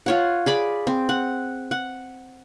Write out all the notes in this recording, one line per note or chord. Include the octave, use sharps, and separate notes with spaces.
F4 C#5 F#5
G#4 D5 B5
C4
F#5
F#5